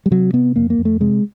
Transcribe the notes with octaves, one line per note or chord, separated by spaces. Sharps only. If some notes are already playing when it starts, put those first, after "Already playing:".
G3
C3 F#3
C3 B3
F2 A#3
A#3
F2
A3
C3 G#3